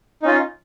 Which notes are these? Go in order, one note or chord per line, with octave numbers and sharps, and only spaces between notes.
C#4 D#4 F4